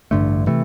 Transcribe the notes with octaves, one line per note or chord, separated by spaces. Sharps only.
A1 G2 D3 A3
C3 E3 A3